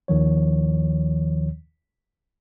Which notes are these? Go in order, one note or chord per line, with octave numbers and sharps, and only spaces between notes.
D#2 D#3 F3 C#5